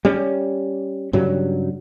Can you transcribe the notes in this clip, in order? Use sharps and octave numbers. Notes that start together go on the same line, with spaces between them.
G3 C#4
G2 C#3 F#3 G3